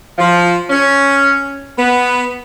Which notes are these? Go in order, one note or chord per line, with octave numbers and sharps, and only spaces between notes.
F3
C#4
B3